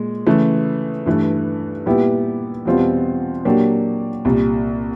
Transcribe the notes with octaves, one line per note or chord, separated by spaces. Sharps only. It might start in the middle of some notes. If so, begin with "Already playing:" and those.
Already playing: A#2 G#3
C#3 E3 A3
G2 E3 A3
A#2 G3 B3 E4 G4
E2 B2 G3 C4 F4
A#2 F#3 A#3 D4 G4
C2 A#2 G3